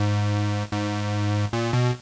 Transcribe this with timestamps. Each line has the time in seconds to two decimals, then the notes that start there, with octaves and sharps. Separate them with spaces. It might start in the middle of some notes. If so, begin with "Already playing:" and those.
Already playing: G#2
0.72 G#2
1.53 A#2
1.73 B2